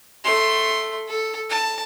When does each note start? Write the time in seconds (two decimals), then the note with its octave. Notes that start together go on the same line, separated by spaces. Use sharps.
0.24 A3 C6
1.08 A4
1.50 A5